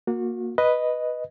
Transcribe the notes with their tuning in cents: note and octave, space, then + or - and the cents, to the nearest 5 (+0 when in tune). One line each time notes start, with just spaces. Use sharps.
A#3 +0 F#4 -30
B4 +0 D#5 +0